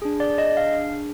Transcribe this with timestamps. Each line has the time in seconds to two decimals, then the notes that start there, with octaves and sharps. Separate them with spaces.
0.02 D4 G#4
0.20 D5
0.38 D#5
0.57 F5